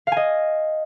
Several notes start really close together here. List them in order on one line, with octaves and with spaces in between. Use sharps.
F5 G#5 D#5